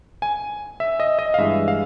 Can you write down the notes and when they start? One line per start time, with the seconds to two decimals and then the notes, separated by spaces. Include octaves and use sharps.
0.22 G#5
0.80 E5
1.00 D#5
1.19 D#5
1.34 F5
1.38 G2 E3 G#3 E5
1.68 F5